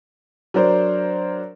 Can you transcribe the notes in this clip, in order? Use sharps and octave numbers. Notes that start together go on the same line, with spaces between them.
F#3 D4 A#4 C5